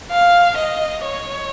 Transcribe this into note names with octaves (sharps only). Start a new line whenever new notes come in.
F5
D#5
C#5